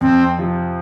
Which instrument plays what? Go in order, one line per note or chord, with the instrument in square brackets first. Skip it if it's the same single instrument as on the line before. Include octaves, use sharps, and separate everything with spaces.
[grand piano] F2 [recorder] C4
[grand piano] C3 F3